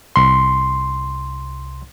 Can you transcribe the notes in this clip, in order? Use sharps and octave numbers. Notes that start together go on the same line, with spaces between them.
C2 C6